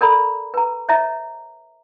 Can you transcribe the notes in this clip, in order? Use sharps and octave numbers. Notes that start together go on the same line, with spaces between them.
A4 A#4 D5 A#5 B5
B4 A#5
C#5 D#5 E5 A#5